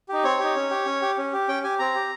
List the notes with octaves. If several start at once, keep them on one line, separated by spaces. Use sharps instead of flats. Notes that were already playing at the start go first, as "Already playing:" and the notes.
D#4 G4
C4 C#5
D#4 G4
C#4
G4
C#4
G4
C#4
G4
C#4 G5
G4 G#5
C4 A#5
G4